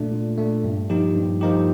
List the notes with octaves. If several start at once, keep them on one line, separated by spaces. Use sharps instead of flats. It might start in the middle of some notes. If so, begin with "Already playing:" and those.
Already playing: A#2 A3 D4
A#2
A3 D4
G2
F3 A#3 D#4 G4
G2
F3 A#3 D#4 G4